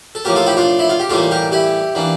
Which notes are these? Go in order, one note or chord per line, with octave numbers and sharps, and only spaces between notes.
A4
A2 F3 A#3 G4 A#4
F4 A4
E4 G4
D4 F4
E4
F4
G4
A2 E3 G3 A#3 F4 A4
G4 A#4
E4 G4
E3 A#3 D4